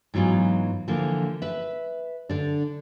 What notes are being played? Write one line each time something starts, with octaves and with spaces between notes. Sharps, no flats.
G#2 E3 F#3 B3 F4
D3 E3 F3 A#3
B4 E5
D3 D4